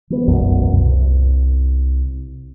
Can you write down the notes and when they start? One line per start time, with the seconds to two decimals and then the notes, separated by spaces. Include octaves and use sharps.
0.10 E3 B3
0.26 E1 B1 F#2 A#2
0.70 C2